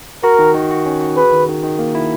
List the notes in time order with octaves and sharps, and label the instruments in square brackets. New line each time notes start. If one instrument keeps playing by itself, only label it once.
[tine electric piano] F#4 [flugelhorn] A#4
[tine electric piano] D#3
D#3
F#4
C#4
F#4
[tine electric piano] G#4 [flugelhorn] B4
[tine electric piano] D#3
D#3
D#3
A#3
E4